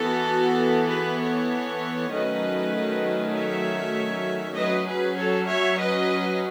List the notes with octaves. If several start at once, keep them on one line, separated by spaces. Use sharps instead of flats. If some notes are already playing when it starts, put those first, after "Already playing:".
Already playing: E3 B3 F#4 A4
G#4 B4
A4 C#5
D#3 F#3 A3 C#4 B4 D#5
C#5 E5
F#3 C#4 B4 D#5
G#4 B4
A4 C#5
C#5 E5
B4 D#5